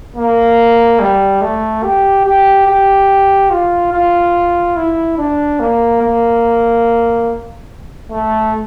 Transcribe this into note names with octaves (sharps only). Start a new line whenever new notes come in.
A#3
G3
A3
G4
G4
G4
F4
F4
E4
D4
A#3
A#3
A3